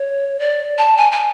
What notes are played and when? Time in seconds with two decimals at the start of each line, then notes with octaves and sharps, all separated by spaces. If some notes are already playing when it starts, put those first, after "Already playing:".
Already playing: C#5
0.39 D5
0.78 A5
0.97 G#5
1.12 G#5